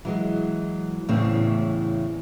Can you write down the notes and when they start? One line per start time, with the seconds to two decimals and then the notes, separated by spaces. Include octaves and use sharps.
0.05 E3 F#3 G#3
1.08 E2 A2 C#3 E3 C4